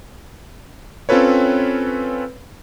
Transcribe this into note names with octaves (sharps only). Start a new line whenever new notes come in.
C4 C#4 F4 A4 B4 C#5